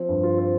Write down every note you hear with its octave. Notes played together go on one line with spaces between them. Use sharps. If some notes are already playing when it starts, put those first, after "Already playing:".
Already playing: F3 C4
G2
F4
C4